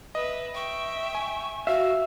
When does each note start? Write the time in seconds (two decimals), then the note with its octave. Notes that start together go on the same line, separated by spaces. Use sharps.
0.15 B4 D#5 E5
0.55 E5 G5 C#6
1.15 G#5
1.67 F#4 E5 F5